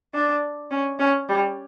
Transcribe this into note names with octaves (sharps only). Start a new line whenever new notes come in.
D4
C#4
C#4
G3